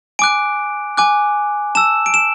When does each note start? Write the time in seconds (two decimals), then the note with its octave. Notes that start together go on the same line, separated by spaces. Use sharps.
0.19 G#5 D6 F#6 D7
0.97 G#5 D6 F#6
1.75 A5 E6 E7
2.06 D7
2.14 E7